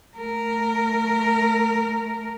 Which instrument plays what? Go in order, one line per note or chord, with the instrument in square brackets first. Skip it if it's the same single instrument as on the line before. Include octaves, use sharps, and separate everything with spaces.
[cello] A3 A#4